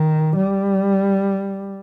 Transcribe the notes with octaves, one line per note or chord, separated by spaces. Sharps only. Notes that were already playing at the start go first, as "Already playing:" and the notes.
Already playing: D#3
G3